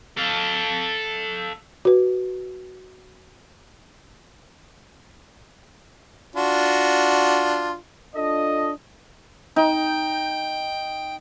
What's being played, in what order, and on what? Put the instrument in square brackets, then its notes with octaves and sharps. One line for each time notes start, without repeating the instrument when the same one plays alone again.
[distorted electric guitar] A4 F5
[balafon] F#4 B4
[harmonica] D4 F4 F#4
[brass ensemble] D4 F4 A4 D#5
[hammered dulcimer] D#4 [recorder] G5